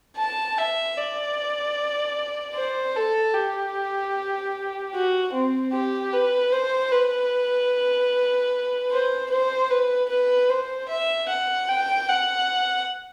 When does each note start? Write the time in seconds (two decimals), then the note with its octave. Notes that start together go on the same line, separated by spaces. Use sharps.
0.17 A5
0.58 E5
0.97 D5
2.55 C5
2.96 A4
3.34 G4
4.94 F#4
5.33 C4
5.73 G4
6.13 B4
6.52 C5
6.91 B4
8.91 C5
9.30 C5
9.70 B4
10.09 B4
10.49 C5
10.88 E5
11.29 F#5
11.68 G5
12.08 F#5